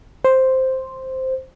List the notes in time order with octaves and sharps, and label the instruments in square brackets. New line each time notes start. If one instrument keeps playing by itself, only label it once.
[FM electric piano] C5